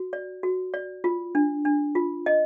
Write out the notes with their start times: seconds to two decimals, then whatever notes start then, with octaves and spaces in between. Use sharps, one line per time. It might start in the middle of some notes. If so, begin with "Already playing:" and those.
Already playing: F#4
0.13 D5
0.43 F#4
0.74 D5
1.04 F4
1.35 D4
1.65 D4
1.95 F4
2.26 D#5